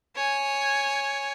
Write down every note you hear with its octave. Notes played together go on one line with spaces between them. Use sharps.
C#5 G#5